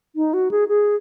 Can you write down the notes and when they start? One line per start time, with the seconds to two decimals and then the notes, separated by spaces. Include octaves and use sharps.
0.16 D#4
0.34 F#4
0.51 G#4
0.68 G#4